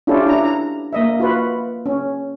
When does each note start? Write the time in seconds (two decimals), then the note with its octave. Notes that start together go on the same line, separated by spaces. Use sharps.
0.07 C#4 D4 E4 F4 G4 A4
0.26 D4 E4 A#5
0.44 A#5
0.93 A#3 D#5 E5
1.20 F4 F#4 B4
1.86 C#4